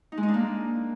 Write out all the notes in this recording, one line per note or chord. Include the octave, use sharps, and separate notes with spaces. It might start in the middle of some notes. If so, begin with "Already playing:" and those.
D#4
G#3
D#4
D4
A#3